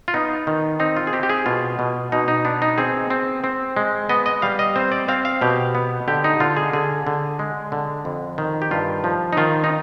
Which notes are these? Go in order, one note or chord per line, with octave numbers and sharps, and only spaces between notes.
F4
B3 D#4
D#3
C4 D#4
F4
G#4
C4 G4
G4
G#4
B2 F4
B2
B2 D#4
D#4
B3 D4
D#4
C4 G#4
C4
C4
G#3
B3 D#5
D#5
G3 F5
D#5
C4 C5
D5
C4 F5
F5
B2 G4
B3
D3 G4
D#4
D3 F4
G#4
D3 G#4
D3
G#3
D3
F2
D#3
G4
G2 F4
F3
D#4
D#3 F4
D#4